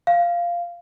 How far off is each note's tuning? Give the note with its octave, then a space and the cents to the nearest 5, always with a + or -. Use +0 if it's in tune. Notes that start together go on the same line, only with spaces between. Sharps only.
F5 -10